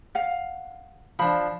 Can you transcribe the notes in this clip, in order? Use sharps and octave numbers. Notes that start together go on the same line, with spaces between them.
F5 F#5
F3 D4 B5